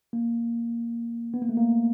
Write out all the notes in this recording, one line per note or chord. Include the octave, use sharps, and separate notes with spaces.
A#3
B3
A#3
A3
A#3